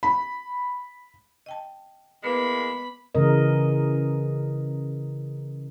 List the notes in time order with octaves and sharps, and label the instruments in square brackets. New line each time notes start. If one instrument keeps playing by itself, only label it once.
[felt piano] B5
[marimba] D#5 G5 A5
[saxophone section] E3 G#3 A#3 [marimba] B3 B4 [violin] B5
[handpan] C#3 E3 G#3 A#4 D#5